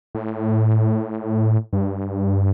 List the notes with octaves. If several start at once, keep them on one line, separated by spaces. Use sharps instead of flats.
A2
G2